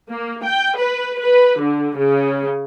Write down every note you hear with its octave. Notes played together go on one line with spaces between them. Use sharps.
A#3
G5
B4
B4
D3
C#3